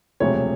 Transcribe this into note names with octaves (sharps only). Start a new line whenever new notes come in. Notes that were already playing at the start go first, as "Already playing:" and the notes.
E1 D2 C3 F3 C#5